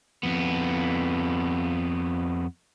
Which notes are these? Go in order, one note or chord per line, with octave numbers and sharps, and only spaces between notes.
F2 B3